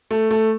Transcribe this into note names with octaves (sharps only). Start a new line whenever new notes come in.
A3
A3